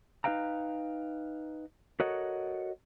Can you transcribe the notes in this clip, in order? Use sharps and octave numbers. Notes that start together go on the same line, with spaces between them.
D#4 G4 B4 F5 G5 A#5
F#4 A4 A#4 C#5 D#5 F#5